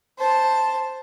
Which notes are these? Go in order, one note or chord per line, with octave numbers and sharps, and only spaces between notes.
C5 A5